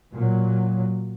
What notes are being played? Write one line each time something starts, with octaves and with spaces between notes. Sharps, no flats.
A#2 F#3